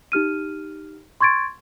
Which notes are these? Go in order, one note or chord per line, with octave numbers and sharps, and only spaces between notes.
D#4 G4 F6 D#7
C6 C#6 G#6 A6 D7